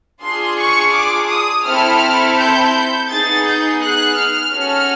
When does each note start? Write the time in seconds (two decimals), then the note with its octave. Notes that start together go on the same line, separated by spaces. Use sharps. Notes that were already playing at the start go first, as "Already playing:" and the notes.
0.23 D4 F4 G#4 C6
0.59 C#6
0.95 D6
1.31 D#6
1.67 C4 E4 A4 F6
2.39 G6
3.11 B3 D#4 G#4 A6
3.47 G6
3.83 F#6
4.18 F6
4.54 C#4 F#4 A4